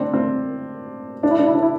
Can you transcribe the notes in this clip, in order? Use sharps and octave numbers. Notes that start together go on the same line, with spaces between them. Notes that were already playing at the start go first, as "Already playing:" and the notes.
Already playing: C4 D4
C4
D4
E4
D4
E4
D4
E4